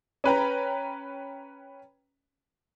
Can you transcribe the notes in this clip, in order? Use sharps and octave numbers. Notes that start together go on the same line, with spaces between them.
C#4 B4 G5 A#5